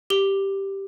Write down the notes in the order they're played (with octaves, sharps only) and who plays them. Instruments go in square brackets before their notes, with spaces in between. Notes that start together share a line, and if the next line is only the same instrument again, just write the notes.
[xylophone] G4 G7